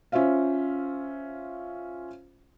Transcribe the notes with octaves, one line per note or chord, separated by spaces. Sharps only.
C#4 F4 C5 E5 F5